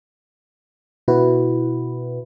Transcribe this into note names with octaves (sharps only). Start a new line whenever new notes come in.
B2 E4 F#4 B4